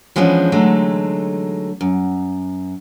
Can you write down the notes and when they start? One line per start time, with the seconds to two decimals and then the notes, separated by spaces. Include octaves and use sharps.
0.16 E3 F3 G#3 B3 C#4 D4
0.52 D3 F#3 G#3 A3 D#4
1.81 F#2